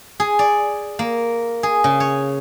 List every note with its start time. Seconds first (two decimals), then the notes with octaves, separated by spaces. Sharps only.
0.20 G#4
0.39 D5
0.99 A#3
1.63 G#4
1.84 C#3
2.00 C#5